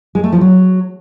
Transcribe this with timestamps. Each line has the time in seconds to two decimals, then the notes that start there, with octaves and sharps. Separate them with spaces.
0.15 G#3
0.24 A3
0.32 F3
0.41 F#3